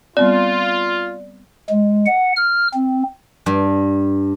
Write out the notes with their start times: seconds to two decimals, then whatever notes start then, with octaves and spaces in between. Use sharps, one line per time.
0.17 G3 B3 C4 F4 D5
1.70 G#3
2.06 F#5
2.36 F6
2.74 C4
3.46 G2